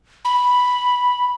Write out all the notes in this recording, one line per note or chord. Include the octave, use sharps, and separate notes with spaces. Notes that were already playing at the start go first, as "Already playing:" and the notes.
B5